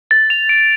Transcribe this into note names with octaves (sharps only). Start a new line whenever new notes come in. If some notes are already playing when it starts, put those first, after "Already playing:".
A6
F7
D7